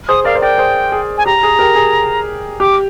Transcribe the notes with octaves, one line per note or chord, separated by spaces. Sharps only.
G#4 C5 D#6
A#4 D5 F5
C5
A#4 D5 G5
G#4 C5
G#4
G#5
G4 A#5
G#4
G4 A#4
G#4
G4 D6